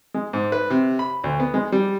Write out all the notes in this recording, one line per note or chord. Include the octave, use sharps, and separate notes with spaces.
G#3
G#2
B4
C3
B5
D2
B3
G#3
G3